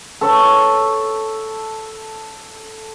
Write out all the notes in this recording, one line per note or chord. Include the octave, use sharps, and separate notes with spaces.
A4 B4 C#5